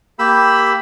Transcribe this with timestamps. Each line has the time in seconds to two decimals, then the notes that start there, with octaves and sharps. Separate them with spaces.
0.19 A#3 G4 B5 E6